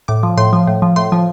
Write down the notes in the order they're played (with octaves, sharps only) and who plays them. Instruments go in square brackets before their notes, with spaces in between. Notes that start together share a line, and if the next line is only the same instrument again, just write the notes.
[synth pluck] A2 D6
F3
A2 C6
F3
A2
F3
A2 C6
F3